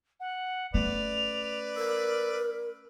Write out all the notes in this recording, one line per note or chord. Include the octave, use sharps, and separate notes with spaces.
F#5
A3 C#4 B4 D5 F7
A#4 E6